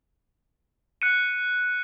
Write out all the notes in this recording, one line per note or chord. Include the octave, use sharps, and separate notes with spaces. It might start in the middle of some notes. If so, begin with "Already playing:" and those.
F#6 C#7 D#7